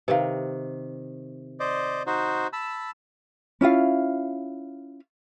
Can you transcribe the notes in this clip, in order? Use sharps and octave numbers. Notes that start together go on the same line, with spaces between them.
C3 D#3 B4 F5
C5 D5 D#5
D#4 F#4 C5
A5 B5 E6
C#4 E4 F4 F5